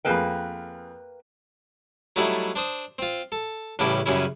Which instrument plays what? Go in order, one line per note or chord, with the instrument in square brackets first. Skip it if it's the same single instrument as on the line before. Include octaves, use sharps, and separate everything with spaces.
[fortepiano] F2 G#4 A#4 [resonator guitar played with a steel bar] A#3 B4 G5
[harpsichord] F#3 G3 A3 D#4 E4
D4 C5 D#6
C4 F4
A4
A1 A2 C#3 G3 E4 G4
F#2 C#3 G3 C#4 E4